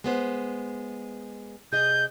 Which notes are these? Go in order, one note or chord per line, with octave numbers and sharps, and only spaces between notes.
G#3 B3 C5
C3 G#4 D#5 G6